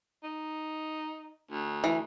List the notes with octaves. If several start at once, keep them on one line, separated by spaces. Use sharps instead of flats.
D#4
D2
E3